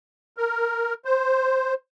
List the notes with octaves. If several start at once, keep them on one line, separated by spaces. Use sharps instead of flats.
A#4
C5